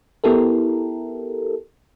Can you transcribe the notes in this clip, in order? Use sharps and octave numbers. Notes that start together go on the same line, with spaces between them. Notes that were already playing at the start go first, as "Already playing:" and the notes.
B3 E4 G4 A4 A#4